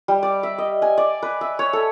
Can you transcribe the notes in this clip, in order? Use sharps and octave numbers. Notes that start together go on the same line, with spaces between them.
G3
D5
E5
D#5
G#5
D5
B4
E5
C#5
A4